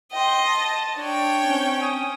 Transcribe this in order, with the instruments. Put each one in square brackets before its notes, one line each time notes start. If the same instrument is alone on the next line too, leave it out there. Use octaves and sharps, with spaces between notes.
[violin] D#5 [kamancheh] G5 C6
[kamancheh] A5
[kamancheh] D4 [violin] C#5 G5
[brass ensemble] C4 C#4
[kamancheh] D#6